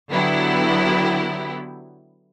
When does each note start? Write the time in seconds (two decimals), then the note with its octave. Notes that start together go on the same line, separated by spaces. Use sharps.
0.10 D3 F#3 B3 E4 G4